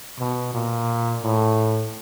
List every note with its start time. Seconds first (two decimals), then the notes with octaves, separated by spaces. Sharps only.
0.19 B2
0.54 A#2
1.23 A2